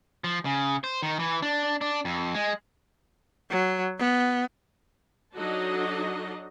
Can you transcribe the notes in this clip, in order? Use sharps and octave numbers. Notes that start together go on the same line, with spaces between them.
F3
C#3
C5
D#3
E3
D4
D4
F2
G#3
F#3
B3
F#3 D4 D#4 F#4 A4 D#5